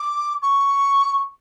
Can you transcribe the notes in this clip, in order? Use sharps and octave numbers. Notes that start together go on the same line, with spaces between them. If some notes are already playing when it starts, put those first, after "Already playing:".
Already playing: D6
C#6